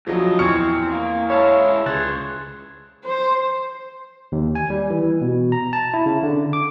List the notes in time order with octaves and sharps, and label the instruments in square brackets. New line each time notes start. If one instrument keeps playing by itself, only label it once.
[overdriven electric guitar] D2 D#5 [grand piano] F3 F#3
[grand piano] E2 C#6 C#7 [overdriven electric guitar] C4 [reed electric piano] F6 G#6
[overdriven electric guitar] A#3
[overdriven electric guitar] G#3 E4 [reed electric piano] C#5 F5 A5
[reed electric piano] C#2 F#6 A6 [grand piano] G#4 [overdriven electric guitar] C5 C#5
[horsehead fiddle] C5
[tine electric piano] D#2
G#5
G3
E3
B2
A#5
A5
E4
C#3
D3
D6